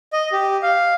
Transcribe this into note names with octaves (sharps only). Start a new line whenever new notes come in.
D#5
G4
F5